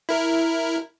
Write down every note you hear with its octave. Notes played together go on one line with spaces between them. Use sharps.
E4 A#4